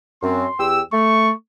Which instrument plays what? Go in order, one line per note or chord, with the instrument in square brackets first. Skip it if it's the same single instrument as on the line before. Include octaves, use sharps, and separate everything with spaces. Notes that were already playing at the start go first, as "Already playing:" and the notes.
[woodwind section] F#2 C4 [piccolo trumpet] C6
[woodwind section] E2 G4 E6
[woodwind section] A3 [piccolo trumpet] C#6